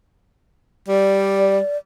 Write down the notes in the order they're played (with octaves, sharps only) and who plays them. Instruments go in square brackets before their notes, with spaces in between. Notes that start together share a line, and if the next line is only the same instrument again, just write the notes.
[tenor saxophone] G3 [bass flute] D5